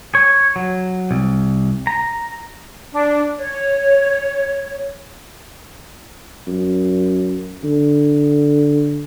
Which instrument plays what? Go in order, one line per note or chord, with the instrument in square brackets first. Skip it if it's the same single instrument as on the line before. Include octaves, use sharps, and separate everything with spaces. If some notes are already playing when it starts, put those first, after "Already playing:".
[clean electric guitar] C#5
F#3
C2
A#5
[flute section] D4
C#5
[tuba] F#2
D3